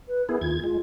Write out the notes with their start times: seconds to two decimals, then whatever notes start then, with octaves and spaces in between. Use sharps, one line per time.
0.08 B4
0.29 B3 E4 G#4 A#4
0.41 D#2 F4 G#6
0.64 G#3 F4